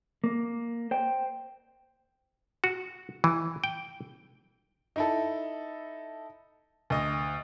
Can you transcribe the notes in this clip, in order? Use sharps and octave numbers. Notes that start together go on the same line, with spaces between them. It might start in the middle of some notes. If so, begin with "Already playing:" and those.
A#3
C5 G5
F#4
E3
G5
D#4 E4 A4
D2 D#5